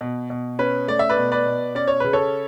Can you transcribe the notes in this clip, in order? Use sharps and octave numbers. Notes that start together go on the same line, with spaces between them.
B2
B2
C#4 B4
A3 D5
E5
B4 D5
B2
B4 D5
B2
C#4 D5
C#5
C#3 B4
A4 C#5